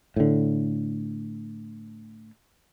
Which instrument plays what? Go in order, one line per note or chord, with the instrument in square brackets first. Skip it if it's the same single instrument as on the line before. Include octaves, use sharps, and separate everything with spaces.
[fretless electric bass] A2 D3